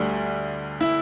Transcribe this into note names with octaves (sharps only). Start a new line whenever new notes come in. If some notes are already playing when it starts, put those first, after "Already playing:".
Already playing: D2 D3 G3 A3 D4
E4